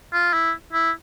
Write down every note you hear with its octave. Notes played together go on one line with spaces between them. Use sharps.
F4
E4
E4